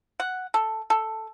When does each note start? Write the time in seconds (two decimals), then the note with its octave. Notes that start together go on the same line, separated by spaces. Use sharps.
0.20 F#5
0.54 A4
0.90 A4